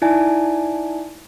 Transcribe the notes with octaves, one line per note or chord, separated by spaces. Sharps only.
D#4 E4 D5 G#5 A5